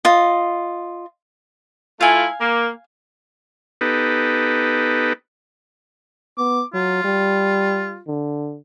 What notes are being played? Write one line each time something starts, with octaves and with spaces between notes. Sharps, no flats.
F4 D#5
A3 E4 F4 F5 G#5
A#3
B3 D#4 G4 A4 B4
B3 D6
F#3 F4
G3
D3